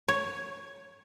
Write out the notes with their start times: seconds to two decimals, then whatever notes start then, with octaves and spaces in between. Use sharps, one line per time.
0.08 C#5